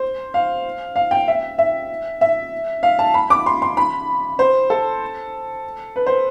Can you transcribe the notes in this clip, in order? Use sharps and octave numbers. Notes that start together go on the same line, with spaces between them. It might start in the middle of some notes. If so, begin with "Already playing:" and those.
Already playing: C5
F5
F5
G5
E5
E5
E5
F5
A5
B5
D6
C6
C6
B5
C5
A4
B4
C5